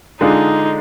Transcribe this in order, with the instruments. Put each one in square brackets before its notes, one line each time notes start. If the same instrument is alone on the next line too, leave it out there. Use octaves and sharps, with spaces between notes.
[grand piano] D3 G#3 D4 F4 G#4 [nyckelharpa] D#4